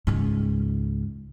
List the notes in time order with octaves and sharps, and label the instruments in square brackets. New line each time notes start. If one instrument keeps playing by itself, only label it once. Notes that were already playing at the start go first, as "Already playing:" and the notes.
[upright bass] C#2 G#2